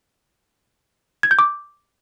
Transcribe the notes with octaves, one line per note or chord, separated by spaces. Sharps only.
G#6
G6
D6